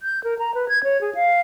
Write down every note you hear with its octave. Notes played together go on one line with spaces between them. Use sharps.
G6
A#4
A#5
B4
G#6
C#5
G#4
F5